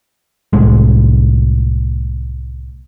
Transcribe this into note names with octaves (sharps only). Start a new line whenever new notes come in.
C2 A2 G#3